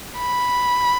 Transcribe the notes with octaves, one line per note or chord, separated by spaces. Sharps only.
B5